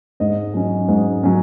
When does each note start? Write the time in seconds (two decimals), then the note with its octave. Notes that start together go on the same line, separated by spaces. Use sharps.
0.20 G#2 D#5
0.54 F#3 C#4
0.88 G#2
1.23 F#3 C#4